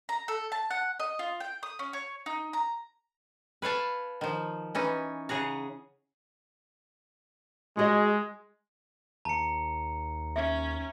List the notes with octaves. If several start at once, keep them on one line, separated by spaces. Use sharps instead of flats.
A#5
A4
A5
F#5
D#5
F4
G5
D#6
C#4
C#5
D#4
A#5
B4 C#5 F5 A5
D#3 F3
E3 C#4 D#4
C#3 G#4 F#5 A#5
G#3 F#4 G#4 D#5
D#2 A5 A#5 C#7
C#4 E5